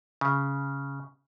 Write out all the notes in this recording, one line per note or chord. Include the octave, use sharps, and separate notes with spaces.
C#3